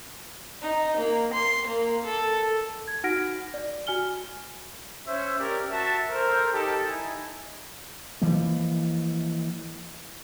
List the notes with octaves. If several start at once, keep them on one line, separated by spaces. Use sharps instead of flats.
D#4
A#3
C6
A#3
A4
G#6
D#4 F#4 F#5 F6 A#6 D7
D5
F#4 G#5 F6 G7
C#4 C5 E5
C#4 G4 A#4 D5
F#4 E5 A5
A4 A#4 C5
D#4 G4 A4 A5
D#4 E4 G#5
E3 F3 G#3 A#3